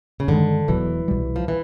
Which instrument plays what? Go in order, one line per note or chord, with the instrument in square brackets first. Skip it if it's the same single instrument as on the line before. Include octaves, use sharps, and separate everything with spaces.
[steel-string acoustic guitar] C#3
[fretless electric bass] G2 D#3 G#3 [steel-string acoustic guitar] D3
[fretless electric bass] E1 E2 B2 F#3 [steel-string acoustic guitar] E3
[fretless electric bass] C2 B2 G3
[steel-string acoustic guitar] F3
E3